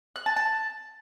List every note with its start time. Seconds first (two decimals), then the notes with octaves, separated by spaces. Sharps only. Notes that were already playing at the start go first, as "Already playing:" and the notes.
0.16 F#6
0.26 A5
0.36 A5